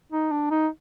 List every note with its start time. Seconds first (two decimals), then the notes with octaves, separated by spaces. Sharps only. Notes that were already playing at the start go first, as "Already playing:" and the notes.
0.12 D#4
0.31 D4
0.50 D#4